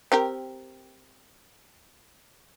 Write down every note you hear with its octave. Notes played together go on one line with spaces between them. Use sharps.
C4 G4 A#4